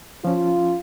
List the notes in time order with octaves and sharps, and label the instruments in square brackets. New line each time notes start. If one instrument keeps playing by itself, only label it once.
[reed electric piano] F3 C#4 [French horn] F4